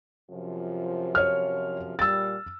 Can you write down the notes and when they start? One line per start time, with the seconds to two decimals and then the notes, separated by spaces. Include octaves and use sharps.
0.30 F#2 C3 F3
1.15 C#5 F6
1.99 A#2 G3 E6 A6